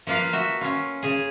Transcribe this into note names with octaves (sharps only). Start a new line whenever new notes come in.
F3 A#3 F4 B4 F5
F#4 E5
C#4 F4
C#3 G#4